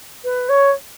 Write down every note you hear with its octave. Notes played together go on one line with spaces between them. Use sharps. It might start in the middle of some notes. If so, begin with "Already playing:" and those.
B4
C#5